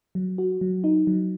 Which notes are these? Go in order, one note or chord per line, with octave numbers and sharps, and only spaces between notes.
F#3
F#4
F#3
D#4
F#3